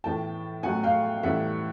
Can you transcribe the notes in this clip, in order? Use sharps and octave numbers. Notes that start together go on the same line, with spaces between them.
A2 E3 A3 G5 A5
A2 F#3 A3 F#5 G#5
F5 G5
A2 E3 G3 E5 F#5